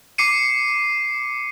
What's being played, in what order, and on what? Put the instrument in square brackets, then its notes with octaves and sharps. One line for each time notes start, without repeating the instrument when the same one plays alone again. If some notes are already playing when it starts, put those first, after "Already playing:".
[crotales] D6 C7 C#7 D#7